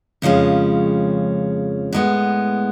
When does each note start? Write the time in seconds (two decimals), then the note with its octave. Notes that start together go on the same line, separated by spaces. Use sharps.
0.22 F2 C#3 F3 G#3 C#4
1.93 A2 G#3 B3